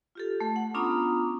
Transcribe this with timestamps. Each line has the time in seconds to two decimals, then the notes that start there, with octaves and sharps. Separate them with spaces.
0.15 F4 G4 A4
0.40 A3
0.56 F#5
0.74 B3 C#4 D4 F4 A#5 D#6